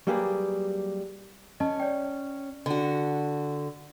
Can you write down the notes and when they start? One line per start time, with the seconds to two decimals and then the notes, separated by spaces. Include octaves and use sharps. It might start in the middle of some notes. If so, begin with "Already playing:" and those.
0.07 F#3 G3 A#3 G4 G#4 B4
1.60 C#4 D#5 A5
1.80 C#5 D5 G5
2.66 D3 F#4